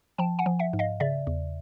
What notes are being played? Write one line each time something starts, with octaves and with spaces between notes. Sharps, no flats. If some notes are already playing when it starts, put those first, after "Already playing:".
F3 G5 A5
F#5 G#5
F3
E5 F#5
G#2
D#5 F5
C#3 D5 E5
E2